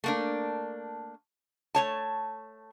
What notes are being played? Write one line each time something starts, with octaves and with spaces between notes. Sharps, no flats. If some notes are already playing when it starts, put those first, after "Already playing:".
A3 A#3 D4
A3 C#5 A5